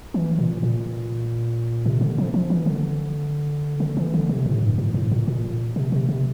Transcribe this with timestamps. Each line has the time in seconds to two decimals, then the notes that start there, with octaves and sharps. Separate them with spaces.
0.14 E3
0.39 A#2
0.63 A#2
1.86 C3
2.01 D3
2.18 F3
2.34 F3
2.50 E3
2.66 D3
3.80 D3
3.97 E3
4.14 D3
4.29 C3
4.46 A2
4.62 G2
4.78 A2
4.94 A2
5.12 A#2
5.28 A#2
5.76 C3
5.92 C3
6.09 C3